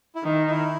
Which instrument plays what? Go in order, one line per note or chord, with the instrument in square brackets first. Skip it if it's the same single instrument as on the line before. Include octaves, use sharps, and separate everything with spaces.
[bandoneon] E4
[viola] D#3 [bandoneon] D#4
[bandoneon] D#4
E4